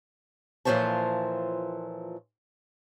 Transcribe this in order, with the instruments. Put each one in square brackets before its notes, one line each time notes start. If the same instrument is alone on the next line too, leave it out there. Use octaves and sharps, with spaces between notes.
[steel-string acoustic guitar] A#2 E3 F3 C5 C#5 A5